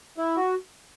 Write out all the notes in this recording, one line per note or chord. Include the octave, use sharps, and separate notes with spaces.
E4
F#4